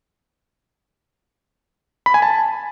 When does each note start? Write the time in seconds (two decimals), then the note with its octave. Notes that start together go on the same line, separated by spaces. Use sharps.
2.06 B5
2.14 G#5
2.22 A5